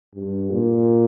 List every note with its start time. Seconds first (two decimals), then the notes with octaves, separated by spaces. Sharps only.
0.15 G2
0.51 A#2